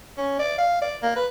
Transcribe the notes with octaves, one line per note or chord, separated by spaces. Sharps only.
C#4
D5
F5
D5
A#3
B4